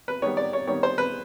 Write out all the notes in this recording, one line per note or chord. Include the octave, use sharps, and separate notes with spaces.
B4
D#3 G3 B3 C#5
D5
C#5
D#3 G3 B3 C#5
C5
B4